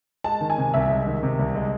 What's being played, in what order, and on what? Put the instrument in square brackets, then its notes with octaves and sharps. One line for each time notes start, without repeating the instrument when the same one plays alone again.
[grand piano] G#3 [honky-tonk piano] A5
[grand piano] D#3
[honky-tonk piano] G#5
[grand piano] C3
[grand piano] C2 [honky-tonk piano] E5
[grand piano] G#3
D#3
C3
C2
G#3